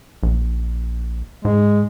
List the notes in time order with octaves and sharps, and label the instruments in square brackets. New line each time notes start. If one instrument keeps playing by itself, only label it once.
[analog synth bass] A#1
[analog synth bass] G#2 [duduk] G#3